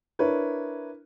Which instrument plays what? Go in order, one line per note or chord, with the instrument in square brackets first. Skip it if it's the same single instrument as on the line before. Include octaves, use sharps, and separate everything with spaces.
[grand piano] D4 E4 A#4 B4 C#5